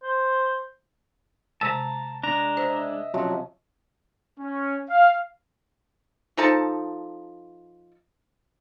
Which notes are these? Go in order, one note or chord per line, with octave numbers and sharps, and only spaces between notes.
C5
C3 G#3 A5 A#5 E6
G#3 D4 A#5
C5 D#5 E5
C3 F3 F#3 C#4
C#4
F5
F3 D#4 A4 A5